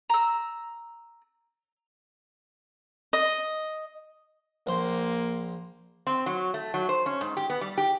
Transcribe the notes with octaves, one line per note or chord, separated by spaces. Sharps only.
A#5 E6
D#5
A#1 A#3 C5
C4
F#3
A3
F#3
C5
C#4
G#2
G4
B3
G3
G4